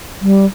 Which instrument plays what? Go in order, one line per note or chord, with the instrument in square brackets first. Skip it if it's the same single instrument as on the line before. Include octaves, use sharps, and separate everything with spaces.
[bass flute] G3